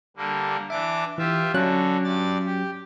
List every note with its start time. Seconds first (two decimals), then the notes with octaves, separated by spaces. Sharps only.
0.17 D3 G3 A#3
0.70 E3 D4 E5 D6
1.18 E3 F4 G4 E5
1.54 D3 F#3 C#4 F#4 F#6
2.04 G2 D5 A6
2.45 G4